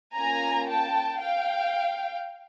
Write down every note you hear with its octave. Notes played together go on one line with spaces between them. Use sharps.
A#3 C#4 F4 G#5 A#5
G5 A5
F5 G5